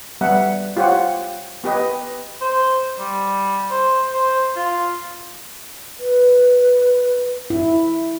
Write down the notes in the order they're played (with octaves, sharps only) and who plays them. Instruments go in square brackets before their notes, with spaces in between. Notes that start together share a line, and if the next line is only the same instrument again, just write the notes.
[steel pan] G3 B3 E5 F#5
F4 G4 C5 C#5 F#5
B3 G4 B4 D#5
[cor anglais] C5
G3
C5
C5
F4
[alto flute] B4
[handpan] E4